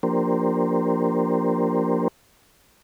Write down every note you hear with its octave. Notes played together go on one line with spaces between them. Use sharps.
F3 A#3 D4 G4 A#4 C5